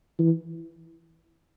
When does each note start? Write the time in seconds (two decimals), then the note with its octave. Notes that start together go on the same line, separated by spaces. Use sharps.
0.19 E3